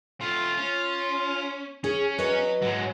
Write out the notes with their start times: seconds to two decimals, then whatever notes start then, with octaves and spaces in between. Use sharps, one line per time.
0.21 A3 C4 F4
0.57 C#4
1.84 C#4 G#4
2.18 F#3 B4 D#5
2.62 G#2 F#3 G#3